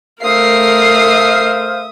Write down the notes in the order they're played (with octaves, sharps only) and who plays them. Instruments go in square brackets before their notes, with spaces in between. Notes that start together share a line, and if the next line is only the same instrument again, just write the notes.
[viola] A3 A#4 [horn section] C5 F5 [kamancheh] E5 D#6 [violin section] C7